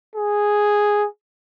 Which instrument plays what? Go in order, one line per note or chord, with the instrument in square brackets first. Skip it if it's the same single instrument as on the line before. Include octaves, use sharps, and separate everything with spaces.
[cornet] G#4